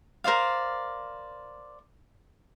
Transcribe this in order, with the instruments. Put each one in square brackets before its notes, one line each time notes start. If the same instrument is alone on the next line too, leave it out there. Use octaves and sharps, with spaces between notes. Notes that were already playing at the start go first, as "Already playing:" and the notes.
[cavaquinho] A#4 C5 D5 F5